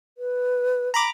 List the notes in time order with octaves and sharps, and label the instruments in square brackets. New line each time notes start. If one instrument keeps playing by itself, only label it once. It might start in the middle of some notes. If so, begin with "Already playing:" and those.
[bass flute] B4
[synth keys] A#5 B5 D6